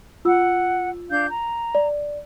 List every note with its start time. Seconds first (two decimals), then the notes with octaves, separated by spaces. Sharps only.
0.25 F4 F#5 E6
1.09 D4 F5 G6
1.30 A#5
1.75 D5